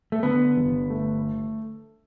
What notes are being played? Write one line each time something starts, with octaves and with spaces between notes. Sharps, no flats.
A3
D3 B3
G1
A3